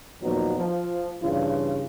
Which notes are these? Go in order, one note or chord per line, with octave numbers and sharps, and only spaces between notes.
D#2 A#2 F3 F#3 B3 D#4
F3
G2 C#3 E3 F4